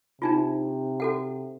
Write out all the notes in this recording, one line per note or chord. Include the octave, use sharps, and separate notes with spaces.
C3 D4 D#4 F4
F#4 A4 F#5